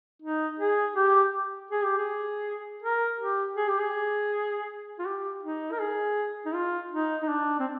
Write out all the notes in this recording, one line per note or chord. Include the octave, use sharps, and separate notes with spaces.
D#4
G#4
G4
G#4
G4
G#4
A#4
G4
G#4
G4
G#4
F4
G4
D#4
A#4
G#4
D#4
F4
D#4
D#4
D4
C4